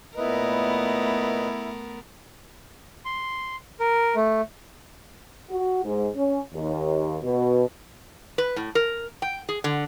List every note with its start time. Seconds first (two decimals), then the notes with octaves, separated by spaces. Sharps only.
0.17 A#2 A3 B3 E4 A#4 B4 D#5
3.05 C6
3.80 A#4
4.15 A3
5.50 F#4
5.84 G#2
6.15 C#4
6.53 D#2
7.22 B2
8.38 B4
8.56 A2
8.75 A#4
9.22 G5
9.49 G#4
9.64 D3